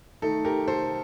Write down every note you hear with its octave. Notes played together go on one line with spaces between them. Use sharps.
D#3 A3 D#4 A4
G4 A#4
A4 C5